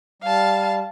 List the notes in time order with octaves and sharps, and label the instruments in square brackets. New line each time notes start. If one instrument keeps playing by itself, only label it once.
[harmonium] G3 [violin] F5 A5